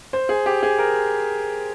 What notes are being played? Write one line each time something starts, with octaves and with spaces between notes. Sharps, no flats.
C5
G#4
G4
G#4
A#4